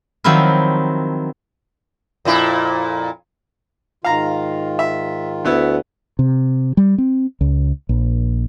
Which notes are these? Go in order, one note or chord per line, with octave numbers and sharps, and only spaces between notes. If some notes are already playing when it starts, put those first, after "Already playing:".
D#3 F3 F#3 C4 E4
F2 A#2 E4
G#2 D#3 F4 F5 A#5
E5
D2 A3 B3 E4
C3
G3
C4
C#2
A#1